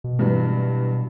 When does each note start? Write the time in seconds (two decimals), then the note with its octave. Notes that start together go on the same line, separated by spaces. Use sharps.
0.04 B2
0.19 G2 E3 F#3